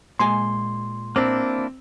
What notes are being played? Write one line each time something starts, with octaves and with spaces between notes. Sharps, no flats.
A#2 G#3 G#5 C6
A#3 C4 D4 E4